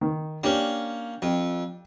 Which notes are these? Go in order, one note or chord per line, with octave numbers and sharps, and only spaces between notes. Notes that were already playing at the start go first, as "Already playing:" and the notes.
D#3
A#3 C#4 D4 G4
F2